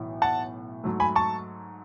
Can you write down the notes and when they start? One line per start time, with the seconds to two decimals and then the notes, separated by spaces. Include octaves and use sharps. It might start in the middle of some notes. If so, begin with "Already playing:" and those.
Already playing: B1 A2 E3
0.22 F#5 A5
0.84 G#2 F#3 A3
1.00 G#5 B5
1.16 A5 C#6